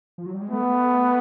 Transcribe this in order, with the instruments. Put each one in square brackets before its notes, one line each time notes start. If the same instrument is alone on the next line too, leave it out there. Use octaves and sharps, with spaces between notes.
[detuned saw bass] F3
F#3
G3
G#3
[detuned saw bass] A3 [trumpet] B3